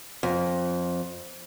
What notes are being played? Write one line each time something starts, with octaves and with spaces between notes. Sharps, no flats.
F2